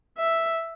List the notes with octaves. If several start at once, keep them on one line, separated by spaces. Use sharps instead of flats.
E5